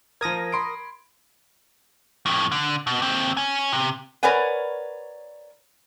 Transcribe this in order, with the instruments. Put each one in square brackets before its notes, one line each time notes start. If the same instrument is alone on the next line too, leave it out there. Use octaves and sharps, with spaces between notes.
[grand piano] F3 G#6 [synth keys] A#4 D#6 A#6
[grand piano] B5 C6 D7
[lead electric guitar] F2 A2
D3
B2
D#2 C4
C#5 G#5
C3
[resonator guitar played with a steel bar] A#4 B4 C#5 D5 F#5 G#5